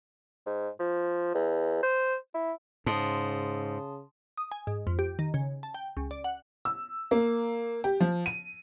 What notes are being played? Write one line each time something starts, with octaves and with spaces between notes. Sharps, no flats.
G#2
F3
E2
C5
E4
G#2 C#3 A5 C6 D#6
D#6
G#5
G#2
F2
G4
D#3
C#3
A5
G5
C#2
D5
F#5
E6
A#3
G4
F3
D#7